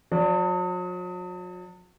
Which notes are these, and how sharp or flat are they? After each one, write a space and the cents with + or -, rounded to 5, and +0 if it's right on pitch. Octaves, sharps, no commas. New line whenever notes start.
F#3 -45 D5 +0